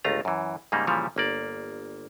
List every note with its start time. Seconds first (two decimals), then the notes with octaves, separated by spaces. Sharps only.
0.04 G1 C#2 A3 F4 A#5
0.25 F#2 E3
0.72 G#2 C#3 G3 A#3 D#4
0.87 A#2 C#3 E3 F3 G3 C#5
1.16 G1 A#3 D5